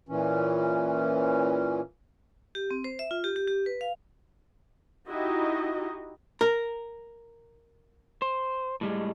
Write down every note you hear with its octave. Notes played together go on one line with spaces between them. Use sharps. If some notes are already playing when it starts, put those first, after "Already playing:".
A#2 E3 C#4
G4
C4
C5
E5
F4
G4
G4
G4
B4
F5
D#4 E4 F#4 G4 D#5
A#4
C5
A2 G3 G#3